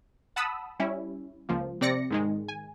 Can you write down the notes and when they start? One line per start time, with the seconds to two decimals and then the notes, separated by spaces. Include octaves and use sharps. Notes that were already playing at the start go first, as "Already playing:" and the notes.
0.36 F#5 A5 B5 D#6 E6
0.80 G3 C#4 E4
1.49 C#2 F3 A#3
1.81 C3 C4 D5 A#6 C#7
2.10 G#2 D#3 G#3
2.48 G#5